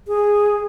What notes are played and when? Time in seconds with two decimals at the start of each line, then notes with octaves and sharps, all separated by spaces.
0.08 G#4